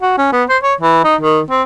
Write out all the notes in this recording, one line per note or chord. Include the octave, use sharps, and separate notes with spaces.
F#4
C#4
B3
C5
C#5
E3
D#4
D#3
C4